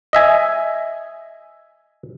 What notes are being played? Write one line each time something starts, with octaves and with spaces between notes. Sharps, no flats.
D#5 E5 G#5